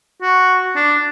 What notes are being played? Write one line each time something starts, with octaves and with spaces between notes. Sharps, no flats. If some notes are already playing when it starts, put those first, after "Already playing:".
F#4
D4